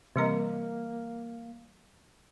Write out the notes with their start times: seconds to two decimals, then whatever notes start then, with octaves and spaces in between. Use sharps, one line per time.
0.16 C3 E3 G3 A#3 A#4 D#5